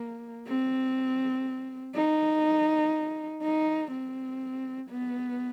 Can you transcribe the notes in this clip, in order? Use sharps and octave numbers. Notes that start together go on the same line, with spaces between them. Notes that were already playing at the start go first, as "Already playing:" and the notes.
Already playing: A#3
C4
D#4
D#4
C4
B3